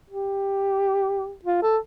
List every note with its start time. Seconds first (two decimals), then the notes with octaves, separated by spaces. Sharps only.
0.11 G4
1.45 F4
1.62 A4